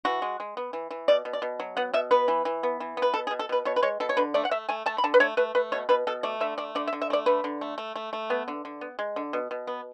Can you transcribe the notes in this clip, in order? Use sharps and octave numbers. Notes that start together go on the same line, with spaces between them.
E3 F#4
G#3
G#3
B3
E3
E3
B2 D5
B2
D5
B2
F#3
B3 F#5
B2 E5
B3 B4
E3
E3
B3
E3
B3
B4
B2 A4
G#4
B2
A4
B2 B4
B2 C#5
B4
G#3 C#5
B2 A4
C#5
D3 B4
A3 D5
F#5
A3 E5
A3 G#5
A3 A5
B5
D3 A5
B4
A3 C#5
A3 B4
A3 B4
B2 C#5
B2 B4
B2 A4
A3 D5
D3 E5
A3 D5
D3 D5
E5
D3
E5
A3 D5
D3 B4
D3
A3
A3
A3
A3
B3
D3
D3
B3
G#3
D3
B2
B2
B3